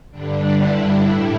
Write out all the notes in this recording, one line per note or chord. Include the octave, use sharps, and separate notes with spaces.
G2 D3 G3 D4
E4
A2 G3